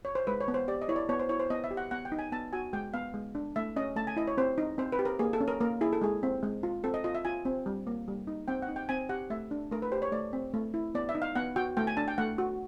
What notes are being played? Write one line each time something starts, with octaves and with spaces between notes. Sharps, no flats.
C#5
C5
G#3 B4
C#5
B3
C5
G4 D5
D#5
E4 C#5
D5
B3 C#5
C5
E4 C#5
C5
B3 D#5
E5
G4
F#5
B3 F#5
G5
D#4
G#5
B3 A5
F#4 G#5
G#3 G5
B3 F5
G#3
D4
A3 E5
C#4 D#5
A3 A5
G#5
E4 D#5
C#5
C4 C5
D#4
C4 C5
B4
G4
A#4
A#3 G#4
A4
C#4
A#4
A#3 A#4
E4 G#4
A4
G#3 G#4
C4
G#3
F4
C4 A4
D#5
F4 D#5
E5
F4 G#5
C4
G3
A#3
G3
D#4
C4 G5
F#5
D#4
G5
C4 G#5
G4 F#5
A3 E5
D4
A3 A#4
B4
G4 C5
C#5
A3 D5
C4
A3
E4
B3 D5
E5
D#4
F5
B3 F#5
F#4 G5
A3 G5
G#5
D4 A5
G5
A3 F#5
F#4